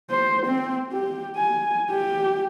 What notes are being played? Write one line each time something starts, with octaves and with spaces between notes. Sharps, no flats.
C5
C4
G4
G#5
G4